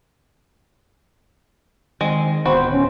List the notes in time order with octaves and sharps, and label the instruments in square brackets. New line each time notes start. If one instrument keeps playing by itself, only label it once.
[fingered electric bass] D#3 [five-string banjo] G#3 C4 G#4
[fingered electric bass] D1 D3 B3 [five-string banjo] C4 F#4 B5 [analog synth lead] C5
[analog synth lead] C#4